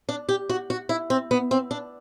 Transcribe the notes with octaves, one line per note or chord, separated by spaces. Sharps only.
D4
G4
F#4
F#4
E4
C4
B3
C4
D4